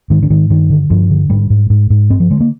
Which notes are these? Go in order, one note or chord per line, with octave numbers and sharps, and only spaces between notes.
G#2 D#3
D3
G#2 D#3
G2 D#3
D3
G2 F3
D3
G#2 G3
G#2
G#2
G#2
G2 C4
F3
D3 G#3
A#3